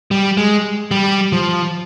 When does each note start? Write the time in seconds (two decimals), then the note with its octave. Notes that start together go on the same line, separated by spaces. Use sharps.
0.11 G3
0.37 G#3
0.91 G3
1.32 F3